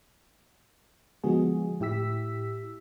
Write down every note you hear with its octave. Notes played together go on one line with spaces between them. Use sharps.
D3 F3 G#3 B3 F#4 G#4
A2 E4 G4 E6 B6